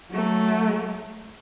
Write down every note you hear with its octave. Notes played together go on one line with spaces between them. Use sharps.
F#3 A3